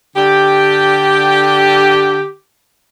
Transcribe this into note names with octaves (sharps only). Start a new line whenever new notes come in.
D3 G4